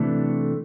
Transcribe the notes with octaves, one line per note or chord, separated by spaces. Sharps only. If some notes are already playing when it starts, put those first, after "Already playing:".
Already playing: C3 E3 A3 D4 A4